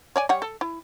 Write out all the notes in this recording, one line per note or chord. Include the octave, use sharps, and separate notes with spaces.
C#5 D5 G#5
G3 C#5 F#5
A4
E4